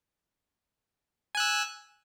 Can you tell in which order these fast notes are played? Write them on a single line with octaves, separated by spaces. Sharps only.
G#5 F#6 E6